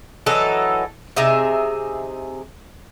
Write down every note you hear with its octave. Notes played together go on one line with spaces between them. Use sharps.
E3 F#3 D#4 A4
C3 D#4 G#4 E5